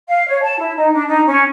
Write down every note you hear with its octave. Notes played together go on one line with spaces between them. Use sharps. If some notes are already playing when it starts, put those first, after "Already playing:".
F5
C#5
A5
E4
D#4
D4
D#4
C#4